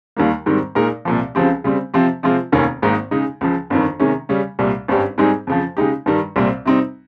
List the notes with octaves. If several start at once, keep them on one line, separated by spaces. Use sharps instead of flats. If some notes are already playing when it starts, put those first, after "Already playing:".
D#2 D#3 G3 A#3
G#2 D#3 G3 C4
A#2 G#3 D#4 A#4
C2 A#2 F3
C#2 C#3 F3 C4 G4
C#3 G3 C4
C3 F3 C4 G4
C3 F3 G#3 C4 F4
F1 D#2 D#3 A#3 C#4
G#1 G#2 D#3 A#3 D#4
C#3 G#3 D#4
C#2 C#3 F3
G1 F2 D#3
C3 D#3 G#3 C#4
C#3 G3 C#4
C2 A#2 G3
G#1 G2 G3 C#4 G4
G#2 G3 C4 D#4 G#4
F2 C#3 F3
C#3 G#3 D#4 G4
G2 D#3 G3
C2 A#2 G3 C4
C3 G3 C4 D#4